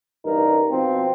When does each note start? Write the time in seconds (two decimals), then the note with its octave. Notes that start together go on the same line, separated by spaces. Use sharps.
0.25 A1 G2 D#4 A#4
0.71 B2 F3 C4